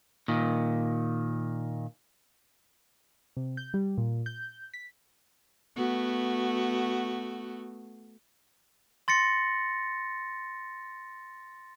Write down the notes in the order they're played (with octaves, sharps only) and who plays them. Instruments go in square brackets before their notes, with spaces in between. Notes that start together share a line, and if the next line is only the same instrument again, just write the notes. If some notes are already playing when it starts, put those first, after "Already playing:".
[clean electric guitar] A#2 D#3
[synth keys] C3
G6
G3
A#2
G6
B6
[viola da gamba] A3 B3 F#4
[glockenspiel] C6 A6 A#6 C#7